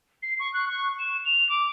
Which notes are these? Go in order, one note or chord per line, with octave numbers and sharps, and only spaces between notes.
C7
C#6
F#6
C#6
E7
F7
D6